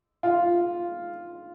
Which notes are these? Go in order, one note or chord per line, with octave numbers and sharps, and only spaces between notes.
F4